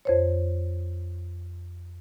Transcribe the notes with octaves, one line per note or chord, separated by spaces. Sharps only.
F2 C5 C#5